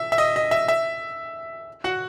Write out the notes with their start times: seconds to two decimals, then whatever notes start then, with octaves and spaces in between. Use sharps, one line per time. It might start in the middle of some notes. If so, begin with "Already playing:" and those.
Already playing: E5
0.12 E5
0.18 D#5
0.36 D#5
0.51 E5
0.68 E5
1.84 F#4 F#5